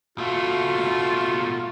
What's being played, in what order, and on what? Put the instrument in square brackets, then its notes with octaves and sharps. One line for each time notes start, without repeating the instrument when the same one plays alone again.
[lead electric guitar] B2 A3 [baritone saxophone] F4 [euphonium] F#4